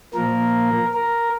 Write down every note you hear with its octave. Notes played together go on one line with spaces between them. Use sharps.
A#2 F3 A#3 A#4
A#4